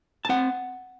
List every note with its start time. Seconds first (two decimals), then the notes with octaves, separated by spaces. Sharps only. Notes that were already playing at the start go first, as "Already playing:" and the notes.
0.25 A5
0.29 C4 F#5